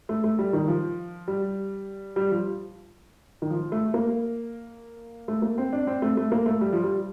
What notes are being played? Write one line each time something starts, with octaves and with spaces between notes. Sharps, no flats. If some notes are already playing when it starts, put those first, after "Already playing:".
A3
A3
G3
D#3
F3
G3
G3
F3
D#3
F3
A3
A#3
A3
A#3
C4
D4
C4
A3
A3
A#3
A3
G3
F3
G3